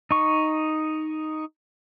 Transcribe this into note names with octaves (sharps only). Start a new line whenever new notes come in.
D#4 C#6